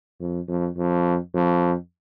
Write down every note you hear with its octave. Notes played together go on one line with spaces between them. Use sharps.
F2
F2
F2
F2